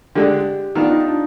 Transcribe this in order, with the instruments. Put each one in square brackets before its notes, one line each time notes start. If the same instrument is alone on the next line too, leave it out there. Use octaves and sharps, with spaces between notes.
[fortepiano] D3 G#3 D4 [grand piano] G4
[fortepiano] D#3 B3 D4 [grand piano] F4
[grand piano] D#4
D4